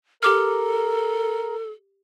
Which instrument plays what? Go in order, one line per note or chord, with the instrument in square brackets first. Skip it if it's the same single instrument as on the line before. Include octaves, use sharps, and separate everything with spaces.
[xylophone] G4 D6 F6 [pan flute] A4 [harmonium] A#4